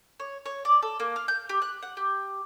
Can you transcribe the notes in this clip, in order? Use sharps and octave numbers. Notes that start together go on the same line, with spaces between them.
C#5
C#5
D5
A4
A#3
F5
G6
G4
F#6
F#5
G4